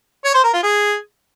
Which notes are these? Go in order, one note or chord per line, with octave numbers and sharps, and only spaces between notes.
C#5
C5
A#4
F4
G#4